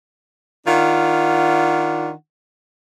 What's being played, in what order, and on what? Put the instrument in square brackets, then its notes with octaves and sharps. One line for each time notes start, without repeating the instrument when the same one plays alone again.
[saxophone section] D#3 D4 F4 F#5